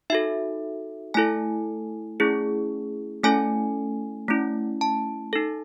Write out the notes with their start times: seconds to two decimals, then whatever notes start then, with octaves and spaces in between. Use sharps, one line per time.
0.10 D#4 F#4 A4 E5
1.14 A3 E4 A4 G#5
2.20 A3 C#4 E4 G#4
3.23 A3 C#4 E4 A4 G#5
4.28 A3 C#4 E4
4.81 A5
5.33 D#4 A4